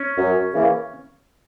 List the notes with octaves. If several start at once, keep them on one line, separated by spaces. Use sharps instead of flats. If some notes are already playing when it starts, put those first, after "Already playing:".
Already playing: C#4
F#2
C#3 E3 A#3